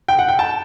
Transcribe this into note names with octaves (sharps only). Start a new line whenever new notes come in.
G5
F#5
G5
A5